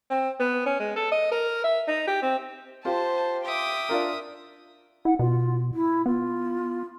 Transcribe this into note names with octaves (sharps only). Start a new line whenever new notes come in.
C4
B3
C#4
G#3
A4
D#5
A#4
E5
D#4
G4
C4
F4 G4 C5 A5
E5 G5 D6 D#6
D4 F4 A#4
E4 F#5
B2 F4
E4
B3 F4